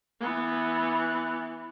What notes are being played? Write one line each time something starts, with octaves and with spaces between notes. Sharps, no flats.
E3 B3